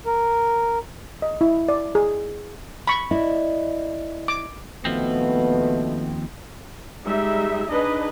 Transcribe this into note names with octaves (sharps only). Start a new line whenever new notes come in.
A#4
D#5
E4
D5
G#4
B5 C#6
E4 D5 D#5
D6
D#2 B2 F3 A3 B3 C4
G3 G#3 D#4 E5
D4 D#4 G#4 B4 D#5